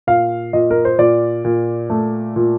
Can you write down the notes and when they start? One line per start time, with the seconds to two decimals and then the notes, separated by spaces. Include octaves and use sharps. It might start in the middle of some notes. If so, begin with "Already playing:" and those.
0.07 A#2 F5
0.53 A#2 D#5
0.71 A#4
0.85 C5
0.98 A#2 D5
1.45 A#2
1.90 A3
2.36 A#2